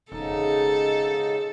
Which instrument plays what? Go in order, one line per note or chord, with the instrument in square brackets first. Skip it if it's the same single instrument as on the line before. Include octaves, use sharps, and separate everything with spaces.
[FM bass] E1 [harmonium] G#2 C#3 D#4 [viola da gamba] A4